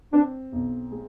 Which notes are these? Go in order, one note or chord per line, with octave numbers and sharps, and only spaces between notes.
C4 D4
B1
G#3